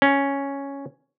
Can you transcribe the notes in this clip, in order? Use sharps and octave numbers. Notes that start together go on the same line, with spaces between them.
C#4